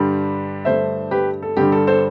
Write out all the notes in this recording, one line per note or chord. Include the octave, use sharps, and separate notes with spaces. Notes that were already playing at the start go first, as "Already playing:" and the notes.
Already playing: G2 D3 G3
G2 D3 A3 C5 E5
G4 B4
A4
G2 D3 G3 G4
A4
A4 C5